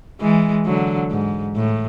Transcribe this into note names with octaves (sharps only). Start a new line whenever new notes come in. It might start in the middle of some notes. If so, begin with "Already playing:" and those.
E3 G#3
D3 F#3
G#2
A2